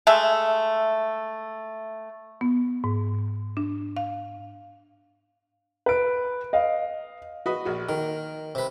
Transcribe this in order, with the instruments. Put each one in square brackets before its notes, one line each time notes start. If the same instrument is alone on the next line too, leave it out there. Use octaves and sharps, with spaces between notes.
[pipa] G#3 A3 E5
[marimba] B3
G#2
D4
F5
[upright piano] B4 D7
D#5 F5
[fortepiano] F#4 B4 D#5
A#1 F#4
[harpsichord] D#3 [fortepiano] A#4
[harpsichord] C3 B4